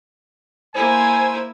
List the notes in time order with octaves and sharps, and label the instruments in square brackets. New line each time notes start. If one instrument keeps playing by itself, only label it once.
[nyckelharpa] A#3 E4 [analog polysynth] C5 G#6 D#7 [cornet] G#5